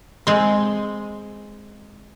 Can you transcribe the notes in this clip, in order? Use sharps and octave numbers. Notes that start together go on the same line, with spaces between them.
G#3 C4